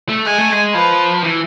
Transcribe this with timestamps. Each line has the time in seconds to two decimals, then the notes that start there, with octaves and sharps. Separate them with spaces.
0.09 A3
0.25 G#3 G#5
0.39 A3
0.52 G#3
0.74 F3 B4
1.23 E3